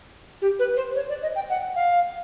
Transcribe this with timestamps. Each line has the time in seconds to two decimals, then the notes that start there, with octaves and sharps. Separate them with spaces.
0.42 G4
0.59 B4
0.77 C5
0.96 C#5
1.09 D5
1.22 D#5
1.36 G5
1.50 F#5
1.76 F5